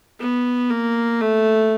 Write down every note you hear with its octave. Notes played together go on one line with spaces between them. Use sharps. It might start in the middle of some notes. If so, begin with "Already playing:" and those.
B3
A#3
A3